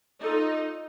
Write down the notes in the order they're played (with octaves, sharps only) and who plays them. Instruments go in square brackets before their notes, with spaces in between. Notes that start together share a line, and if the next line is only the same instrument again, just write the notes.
[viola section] D#4 [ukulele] F4 A4 D5